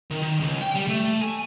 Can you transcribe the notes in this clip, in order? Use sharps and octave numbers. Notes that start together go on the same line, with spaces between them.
D#3
D#3
C#2
G5
G3
A3
G#5